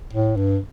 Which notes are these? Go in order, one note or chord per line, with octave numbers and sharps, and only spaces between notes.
A2
G2